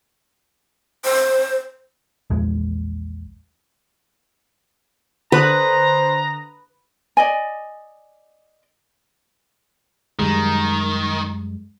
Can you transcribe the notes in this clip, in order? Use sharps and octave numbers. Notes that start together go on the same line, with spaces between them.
C5
A#1 E2 G#3
D3 B4 C5 A#5 D#6 F#6
D5 D#5 G#5
F#2 D#3 G3 G#3